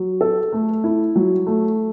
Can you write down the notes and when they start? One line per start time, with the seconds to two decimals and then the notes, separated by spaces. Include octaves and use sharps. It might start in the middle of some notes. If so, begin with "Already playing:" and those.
Already playing: F#3
0.21 A4
0.53 A3
0.84 E4
1.16 F#3
1.47 A3